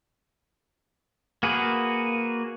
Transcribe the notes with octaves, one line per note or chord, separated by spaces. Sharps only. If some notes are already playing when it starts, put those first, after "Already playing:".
A#3 F#4 G#4 B4